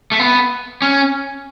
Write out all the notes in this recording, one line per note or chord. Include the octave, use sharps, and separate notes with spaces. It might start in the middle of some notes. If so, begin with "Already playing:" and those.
A3
B3
C#4